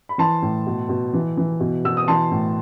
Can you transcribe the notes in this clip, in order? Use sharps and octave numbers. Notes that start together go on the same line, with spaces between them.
B5
E3 A5 C6
A2
B2
B2
E3
E3
B2
B2 E6
D#6
E3 A5 C6
A2